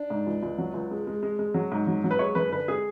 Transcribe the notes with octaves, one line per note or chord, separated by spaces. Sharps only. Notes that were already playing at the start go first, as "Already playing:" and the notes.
Already playing: D4
G#2
C#2
C#2
F#3
C#2
G#3
G#3
G#3
G#3
F#3
G#2
F#3
F#3
B4
G#3 C#5
F#2 B4
D3 B4
G#3 G#4